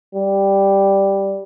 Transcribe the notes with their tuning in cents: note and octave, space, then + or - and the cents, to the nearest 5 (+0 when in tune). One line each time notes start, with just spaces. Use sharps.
G3 +0